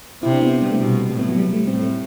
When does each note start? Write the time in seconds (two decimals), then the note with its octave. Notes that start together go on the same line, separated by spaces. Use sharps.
0.23 C3 E4
0.33 D4
0.42 B3
0.62 G3
0.72 A3
0.81 B2 G3
1.10 A2 G3
1.19 B3
1.29 F#3
1.38 G3
1.53 A3
1.67 A2 C4
1.82 A3